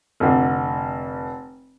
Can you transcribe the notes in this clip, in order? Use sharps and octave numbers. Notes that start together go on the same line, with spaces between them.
F1 D3